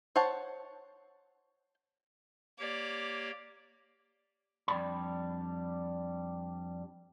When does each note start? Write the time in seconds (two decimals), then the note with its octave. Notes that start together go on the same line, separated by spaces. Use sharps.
0.16 C5 C#5 F#5 A5
2.59 A#3 G4 C#5 D5
4.68 F2 G#2 G3 D4 B5